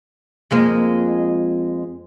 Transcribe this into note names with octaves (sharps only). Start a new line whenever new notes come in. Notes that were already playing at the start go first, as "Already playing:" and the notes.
F2 G#3 A#3